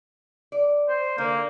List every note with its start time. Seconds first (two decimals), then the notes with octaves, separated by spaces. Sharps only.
0.52 D5
0.88 C5
1.18 D3 A#3